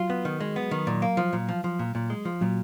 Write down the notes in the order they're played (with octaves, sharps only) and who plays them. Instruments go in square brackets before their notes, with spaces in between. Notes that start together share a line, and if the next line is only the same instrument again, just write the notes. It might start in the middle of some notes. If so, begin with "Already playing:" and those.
Already playing: [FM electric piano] F#3 [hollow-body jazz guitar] F4
[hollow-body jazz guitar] B3
D#3
G#3
B3
D#3
A#2
A#3
F3
A#2
F3
F3
A#2
A#2
G#3
F3
[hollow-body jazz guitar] A#2 [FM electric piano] F#3